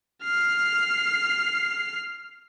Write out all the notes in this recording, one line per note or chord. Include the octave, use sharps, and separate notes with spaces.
F6 C7